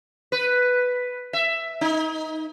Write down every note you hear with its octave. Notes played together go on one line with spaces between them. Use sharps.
B4
E5
D#4